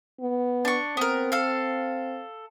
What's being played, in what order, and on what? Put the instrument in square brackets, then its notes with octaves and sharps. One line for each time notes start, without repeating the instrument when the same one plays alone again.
[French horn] B3
[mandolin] D4 C#6
[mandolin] B3 A#4 [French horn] C4
[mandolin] A4 F5